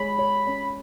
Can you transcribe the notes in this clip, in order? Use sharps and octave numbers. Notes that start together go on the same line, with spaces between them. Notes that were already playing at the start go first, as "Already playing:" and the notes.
Already playing: G#3 C#5 B5
C#5
C#4